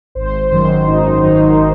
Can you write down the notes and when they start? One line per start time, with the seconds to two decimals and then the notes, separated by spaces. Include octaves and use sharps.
0.15 G#1 C5
0.51 F#2 D#3 F#3 C5
0.88 G#1 D#4
1.23 F#2 D#3 F#3 D#4